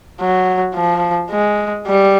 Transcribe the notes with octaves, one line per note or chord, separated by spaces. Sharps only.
F#3
F3
G#3
G3